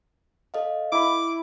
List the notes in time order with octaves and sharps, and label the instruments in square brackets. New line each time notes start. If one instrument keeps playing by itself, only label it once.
[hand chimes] A4 D#5 F5
[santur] E4 B5 [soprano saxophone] D6